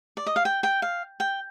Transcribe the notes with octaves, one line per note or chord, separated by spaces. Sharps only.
D5
D#5
F5
G5
G5
F5
G5